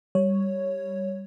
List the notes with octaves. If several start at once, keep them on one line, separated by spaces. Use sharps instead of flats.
G3 C#5